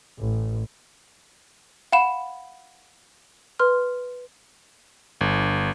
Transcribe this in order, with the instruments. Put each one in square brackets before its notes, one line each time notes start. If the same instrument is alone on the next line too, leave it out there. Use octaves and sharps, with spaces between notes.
[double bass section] A1
[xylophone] F5 F#5 B5 E7
B4 C6 F6
[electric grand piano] G1